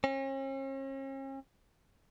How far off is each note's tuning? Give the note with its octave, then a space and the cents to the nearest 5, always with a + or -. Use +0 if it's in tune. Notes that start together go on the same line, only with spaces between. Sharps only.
C#4 -40